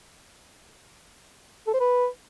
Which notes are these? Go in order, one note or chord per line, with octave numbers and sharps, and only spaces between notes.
A4
C5
B4